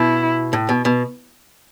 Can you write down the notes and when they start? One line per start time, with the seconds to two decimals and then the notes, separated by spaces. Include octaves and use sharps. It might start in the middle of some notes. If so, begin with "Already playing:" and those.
Already playing: B2 E4
0.53 A2
0.69 B2
0.85 B2